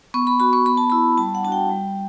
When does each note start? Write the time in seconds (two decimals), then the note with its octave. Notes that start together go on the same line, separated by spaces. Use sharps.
0.14 B3 C#6
0.27 B5
0.40 F#4 B5
0.53 C#6
0.66 B3 B5
0.77 A5
0.90 E4 B5
1.18 G3 A5
1.35 F#5
1.43 D4 A5
1.48 F#4 G5
1.70 G3